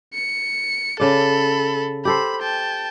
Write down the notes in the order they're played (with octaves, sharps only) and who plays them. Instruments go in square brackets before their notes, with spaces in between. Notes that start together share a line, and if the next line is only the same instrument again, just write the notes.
[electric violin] C#7
[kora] C#3 D5 [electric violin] A4 B5
[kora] G4 A4 C5 [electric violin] B5
[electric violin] G5 A5